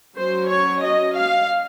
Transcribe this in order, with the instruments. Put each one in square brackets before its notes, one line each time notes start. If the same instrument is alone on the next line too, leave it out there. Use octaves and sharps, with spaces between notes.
[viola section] F#3 C#4 C5
C#5
D#5
F5